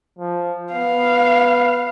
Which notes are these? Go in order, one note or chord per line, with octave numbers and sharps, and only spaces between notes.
F3
B3 F5